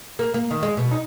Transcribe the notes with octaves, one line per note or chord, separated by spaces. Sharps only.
A#3
A#3
D#3
G#3
B2
D#4